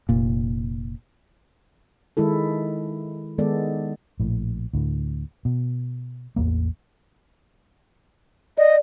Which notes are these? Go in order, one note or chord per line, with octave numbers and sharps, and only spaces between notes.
F1 A#2
D#3 G#3 E4 A4
D#3 G#3 B3 A4 D5
A#1 A2
D2 A2
B2
A1 E2 G#2 A#3
D5 D#5